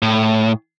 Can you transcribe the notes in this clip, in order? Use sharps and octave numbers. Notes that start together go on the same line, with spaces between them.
A2